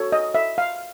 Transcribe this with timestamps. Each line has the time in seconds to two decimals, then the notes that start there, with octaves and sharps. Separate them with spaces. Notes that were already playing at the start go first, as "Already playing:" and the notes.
Already playing: F#4 A4 C#5
0.12 D#5
0.35 E5
0.58 F5